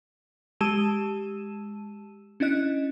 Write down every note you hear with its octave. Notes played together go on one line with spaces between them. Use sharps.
G#3 G4 A5 E6 D#7 E7
C#4 D4 E4 D#5 F#6